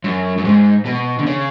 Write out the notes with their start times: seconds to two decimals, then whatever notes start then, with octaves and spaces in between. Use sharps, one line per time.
0.04 F#2
0.38 F#2
0.45 G#2
0.86 B2
1.19 D3
1.26 C#3